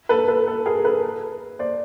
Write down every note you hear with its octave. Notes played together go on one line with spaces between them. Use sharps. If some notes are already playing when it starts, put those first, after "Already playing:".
A4 B4
A4 B4
A4
G#4 A#4
A4 B4
C5 D5